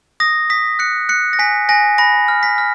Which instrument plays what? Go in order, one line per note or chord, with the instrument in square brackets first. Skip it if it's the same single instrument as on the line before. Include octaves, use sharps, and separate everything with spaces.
[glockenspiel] D#6 A#6
D#6 B6
F#6 C#7
F#6 C#7
A#6
G#5 B6
G#5 A#6
B5 A#6
F6
B6
F6